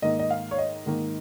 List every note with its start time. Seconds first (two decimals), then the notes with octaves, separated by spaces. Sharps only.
0.02 G#2 D#3 A#3 D#5
0.19 D#5
0.30 F5
0.51 C#5
0.58 D#5
0.86 G#2 D#3 A#3